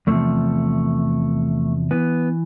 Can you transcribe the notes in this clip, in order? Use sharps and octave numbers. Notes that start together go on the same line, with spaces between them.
E2 C3 F3 A3
E3 B3